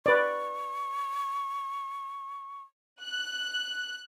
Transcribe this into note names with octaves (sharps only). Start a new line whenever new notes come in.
B4 D5 C#6
F#6